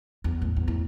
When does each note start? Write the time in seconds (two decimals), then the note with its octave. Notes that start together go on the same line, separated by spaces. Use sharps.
0.24 E2
0.42 A2
0.57 E2
0.68 A2